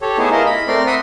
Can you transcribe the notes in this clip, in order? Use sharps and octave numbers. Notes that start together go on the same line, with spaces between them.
G4 A4 C#5
A3 B3 D#4 E4 G#4
E4 F4 G#4 A#4 D#5
B5
A3 C4 A#4 D5 C6
E5 F#5 B5 C6 D#6